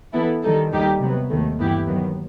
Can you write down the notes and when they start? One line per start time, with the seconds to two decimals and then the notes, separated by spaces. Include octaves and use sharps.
0.14 E3 B3 E4 A4
0.43 D#3 G3 D#4 A4
0.71 D#2 D#3 G3 D#4 G4
1.00 C3 F#3 B3
1.29 D#2 D#3 A3
1.59 G2 E3 B3 E4 G4
1.87 D#2 D#3 F#3 B3